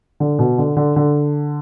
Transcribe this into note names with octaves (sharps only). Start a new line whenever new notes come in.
D3
B2
D3
D3
D3